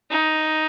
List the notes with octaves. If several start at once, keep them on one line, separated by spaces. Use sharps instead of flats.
D#4